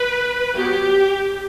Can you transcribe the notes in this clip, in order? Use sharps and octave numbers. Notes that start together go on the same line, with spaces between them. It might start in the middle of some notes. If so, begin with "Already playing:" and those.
Already playing: B4
F#3 B3 G4